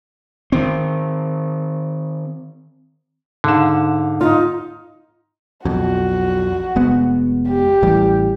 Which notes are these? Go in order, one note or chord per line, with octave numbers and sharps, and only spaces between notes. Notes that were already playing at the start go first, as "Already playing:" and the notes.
D#3 C4
G#2 D3 F5 E7
D#4 F4
B1 F2 F#4
F1 G#3 B3
G4
A1 E3 G3